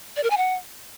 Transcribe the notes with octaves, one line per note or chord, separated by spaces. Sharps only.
D5
A#4
G#5
F#5